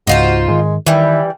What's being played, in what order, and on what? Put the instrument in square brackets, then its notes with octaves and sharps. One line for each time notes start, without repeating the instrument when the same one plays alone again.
[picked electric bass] C#2 G#2 [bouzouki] D#4 F4 C5 [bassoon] F#4
[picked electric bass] G#2 D#3 [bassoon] G#3
[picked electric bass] D#3 [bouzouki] E3 G3 [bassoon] E4